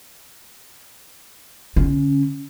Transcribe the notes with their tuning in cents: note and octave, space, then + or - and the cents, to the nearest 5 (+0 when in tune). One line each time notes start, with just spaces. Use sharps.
D3 -35 C#4 +0